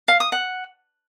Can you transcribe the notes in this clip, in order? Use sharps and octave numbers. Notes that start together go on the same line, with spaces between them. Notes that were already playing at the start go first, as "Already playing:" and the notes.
F5
D#6
F#5